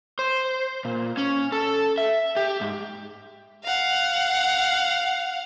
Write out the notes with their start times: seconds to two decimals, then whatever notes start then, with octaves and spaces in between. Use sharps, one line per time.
0.19 C5
0.85 A#2
1.17 C#4
1.52 A4
1.98 E5
2.36 G4
2.61 G#2
3.64 F5 F#5